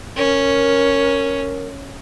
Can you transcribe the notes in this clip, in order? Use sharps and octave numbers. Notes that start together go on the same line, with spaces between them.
C#4 A#4